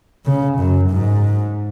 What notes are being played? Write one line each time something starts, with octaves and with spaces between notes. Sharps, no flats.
C#3
F#2
G#2